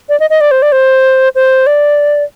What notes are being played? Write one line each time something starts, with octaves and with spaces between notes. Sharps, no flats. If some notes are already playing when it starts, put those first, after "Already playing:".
D5
D#5
D#5
D5
C5
D5
C5
C5
D5